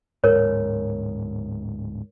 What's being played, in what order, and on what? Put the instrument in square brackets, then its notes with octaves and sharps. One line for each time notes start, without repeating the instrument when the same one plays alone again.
[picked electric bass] D1 G#2 [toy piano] A#4 C#5